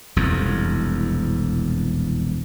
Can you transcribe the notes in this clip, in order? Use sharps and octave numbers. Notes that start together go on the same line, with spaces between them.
E1 C2 F2